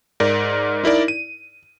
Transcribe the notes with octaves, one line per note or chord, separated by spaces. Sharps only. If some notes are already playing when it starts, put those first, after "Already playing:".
G#2 A#4 D5
D#4 E4 A#4 D5
D#7